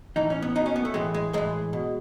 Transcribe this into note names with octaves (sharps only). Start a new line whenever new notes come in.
A2 E3 D#4
C#4
B3
B2 D#4
C#4
B3
A3
A2 E3 G#3
G#3
A2 E3 G#3
B2